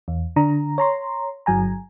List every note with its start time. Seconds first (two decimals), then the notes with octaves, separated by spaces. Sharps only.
0.08 E2
0.36 D3 D4 A#5
0.78 C#5 A#5 C6
1.46 G1 F#3 G#5 A#5